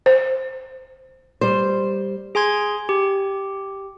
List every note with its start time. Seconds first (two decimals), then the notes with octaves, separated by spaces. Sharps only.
0.06 C5
1.41 G3 C5
2.35 G#4 G#5 C6 G#6
2.89 G4